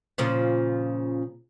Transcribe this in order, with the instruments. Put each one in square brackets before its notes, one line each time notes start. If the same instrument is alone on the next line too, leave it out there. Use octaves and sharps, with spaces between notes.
[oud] A#2 C#3 F3